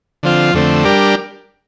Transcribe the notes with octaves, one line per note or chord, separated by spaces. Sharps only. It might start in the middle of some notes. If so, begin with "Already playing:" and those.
D3 F3 C4 F4
F2 D3 A3 C4
G3 D4 G4 A#4